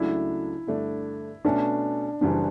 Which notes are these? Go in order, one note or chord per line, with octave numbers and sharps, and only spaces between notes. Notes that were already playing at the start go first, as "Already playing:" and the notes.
Already playing: C#2 C#3 F#3 A3 D4 E4
G2 D3 A3 D4
B2 A3 C#4 D4
F#1 F#2 E3 G3 D4